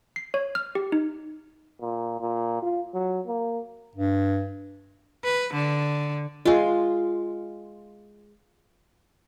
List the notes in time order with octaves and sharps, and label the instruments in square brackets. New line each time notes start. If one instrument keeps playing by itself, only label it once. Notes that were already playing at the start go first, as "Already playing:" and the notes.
[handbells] C7
C#5
F6
G4
D#4
[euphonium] A#2
A#2
F4
F#3
A#3
[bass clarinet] G2
[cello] B4
D3
[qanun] G#3 F4